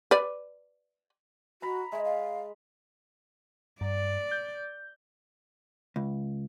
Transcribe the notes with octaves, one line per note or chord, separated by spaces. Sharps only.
B4 D5
F#4 A#5 B5
G#3 E5
F5
G2 D5
G6
C#2